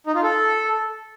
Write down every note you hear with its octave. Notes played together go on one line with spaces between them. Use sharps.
D#4
F4
A4